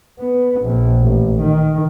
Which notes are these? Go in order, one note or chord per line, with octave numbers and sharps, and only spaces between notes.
B3
A#1
A1
D#3